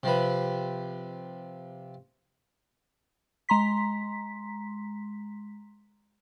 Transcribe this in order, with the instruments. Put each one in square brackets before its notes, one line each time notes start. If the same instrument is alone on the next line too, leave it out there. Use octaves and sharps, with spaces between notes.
[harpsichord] C3 F3 B4
[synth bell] G#3 A#5 C6 B6